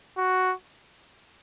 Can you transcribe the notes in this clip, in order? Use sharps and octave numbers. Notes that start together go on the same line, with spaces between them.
F#4